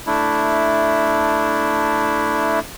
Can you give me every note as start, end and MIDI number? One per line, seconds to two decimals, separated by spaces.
0.07 2.60 57
0.07 2.60 62
0.07 2.60 64